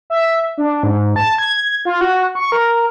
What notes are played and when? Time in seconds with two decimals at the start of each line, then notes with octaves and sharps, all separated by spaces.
0.10 E5
0.58 D4
0.83 G#2
1.16 A5
1.38 G#6
1.85 F4
2.01 F#4
2.35 C#6
2.52 A#4